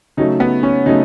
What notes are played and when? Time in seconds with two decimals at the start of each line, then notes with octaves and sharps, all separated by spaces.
0.17 C#3 F#3 A3 D#4
0.40 B3
0.63 C#4
0.86 C#3 F#3 A3 D#4